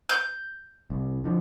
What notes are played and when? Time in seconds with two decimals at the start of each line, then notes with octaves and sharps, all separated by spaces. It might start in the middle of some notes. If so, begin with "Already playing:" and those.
0.09 G6
0.90 C2
1.24 D3 F3